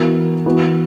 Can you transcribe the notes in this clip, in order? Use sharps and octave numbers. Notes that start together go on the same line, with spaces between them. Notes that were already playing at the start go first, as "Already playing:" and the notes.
Already playing: E3 B3 F#4 A#4
E3 B3 F#4 B4